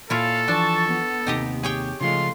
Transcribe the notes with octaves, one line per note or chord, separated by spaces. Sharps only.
A#2 E4 F4 A4 C#5 F5
E3 F3 D4 A5 C#6
B3
D#2 C3 D#4 G4 D#5
G4 G#4 C#5 G5
C#3 F3 G#3 A3 F4 C6